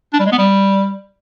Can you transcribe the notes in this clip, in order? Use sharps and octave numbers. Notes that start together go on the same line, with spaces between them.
D4
G3
G#3
B3
G3